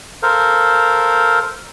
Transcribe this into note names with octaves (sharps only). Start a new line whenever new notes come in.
A4 A#4 C5 F5